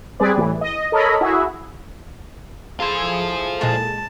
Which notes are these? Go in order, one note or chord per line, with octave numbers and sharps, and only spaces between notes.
G3 C4 G#4 B4 D5
A2 E3
D#5
A4 A#4 C#5 D#5 B5
E4 F#4 G#4 E5
E4 F4 G#4 A4 C5
A#2 G#3 A5